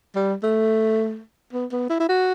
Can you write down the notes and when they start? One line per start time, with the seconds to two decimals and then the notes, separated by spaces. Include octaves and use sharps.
0.15 G3
0.43 A3
1.53 B3
1.72 B3
1.90 E4
2.00 E4
2.09 F#4